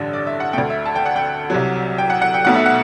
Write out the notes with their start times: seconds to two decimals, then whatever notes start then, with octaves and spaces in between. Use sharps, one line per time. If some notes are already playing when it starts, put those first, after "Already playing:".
Already playing: A1 G2 D3 G3
0.13 D5
0.27 E5
0.40 F#5
0.53 D2 D3 A3 G5
0.70 E5
0.86 A5
0.95 G5
1.06 F#5
1.16 G5
1.50 C2 C3 F#3
1.98 G5
2.10 F#5
2.22 F#5
2.34 G5
2.45 B1 B2 A3 F#5
2.56 E5
2.66 F#5